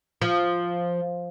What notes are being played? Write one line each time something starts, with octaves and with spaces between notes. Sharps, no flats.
F3